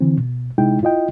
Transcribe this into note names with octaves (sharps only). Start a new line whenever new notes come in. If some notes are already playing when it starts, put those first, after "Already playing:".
D3 E3 C4
B2
C3 G#3 D#4 E4 G5
E4 F4 D#5 G5